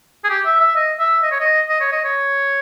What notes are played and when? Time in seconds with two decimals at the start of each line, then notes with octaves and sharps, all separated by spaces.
0.24 G#4
0.30 G4
0.45 E5
0.60 E5
0.76 D#5
0.99 E5
1.23 D#5
1.32 C#5
1.40 D#5
1.69 D#5
1.81 C#5
1.92 D#5
2.04 C#5